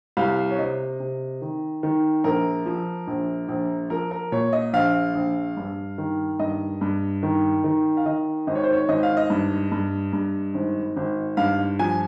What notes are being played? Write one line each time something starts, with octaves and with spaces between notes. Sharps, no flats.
C2 F5
C#5
C3 D#5
C3
D#3
D#3
A#1 A#4
F3
A#1
A#1
F3 A#4
A#4
A#2 C#5
D#5
A#1 F5
A#1
G2
D#3
G2 D#5
G2
D#3
D#3
F5
D#3 D#5
G#1 D#5
C#5
C5
C#5
G#1 D#5
F5
D#5
G2
G2
G2
G#1
G#1
G2 F5
F3 G#5